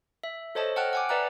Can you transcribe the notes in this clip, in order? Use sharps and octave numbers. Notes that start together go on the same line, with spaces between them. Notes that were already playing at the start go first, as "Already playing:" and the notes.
E5
A4 C5 C#5 D#5 A5
F#5 G5 A5 F6 F#6
F#5 G#5 D6
B4 D5 E5 A#5 F#6